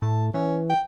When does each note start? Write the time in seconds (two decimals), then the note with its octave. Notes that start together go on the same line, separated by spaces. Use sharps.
0.02 A2 A5
0.34 E3 C#4
0.70 G5